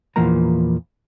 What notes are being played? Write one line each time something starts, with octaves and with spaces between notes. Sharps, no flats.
E2 A#2 E3 F3 A#3 A#5